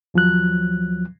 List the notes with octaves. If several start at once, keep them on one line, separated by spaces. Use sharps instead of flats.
D#2 F3 F#3 F#6